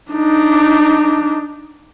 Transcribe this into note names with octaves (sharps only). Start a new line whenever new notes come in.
D4 D#4